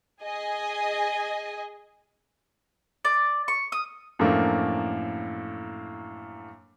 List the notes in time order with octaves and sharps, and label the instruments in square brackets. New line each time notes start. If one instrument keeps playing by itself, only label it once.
[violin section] G#4 D#5 G#5
[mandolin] D5
C#6
D#6
[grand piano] F#2 A2 F3 A3 A#3 D4